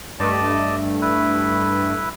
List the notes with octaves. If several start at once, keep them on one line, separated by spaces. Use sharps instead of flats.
G2 A3 D5 D#5 A5
E4 B4